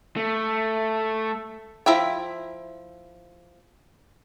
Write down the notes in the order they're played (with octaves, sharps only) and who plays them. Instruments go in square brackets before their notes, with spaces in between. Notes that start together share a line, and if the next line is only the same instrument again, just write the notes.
[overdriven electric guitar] A3
[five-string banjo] F3 E4 E5 G5